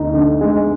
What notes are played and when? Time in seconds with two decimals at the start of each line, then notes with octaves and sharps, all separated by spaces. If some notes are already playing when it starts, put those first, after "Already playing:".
Already playing: D2 D#4
0.13 D3
0.41 G#3